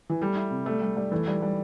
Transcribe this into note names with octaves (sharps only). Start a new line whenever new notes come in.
E3
G3 A3
E4
C3
G3 A3
G3
G3
E3 A3
G3
G3